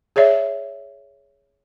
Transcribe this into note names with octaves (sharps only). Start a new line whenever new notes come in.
G#4 C#5 D5 E5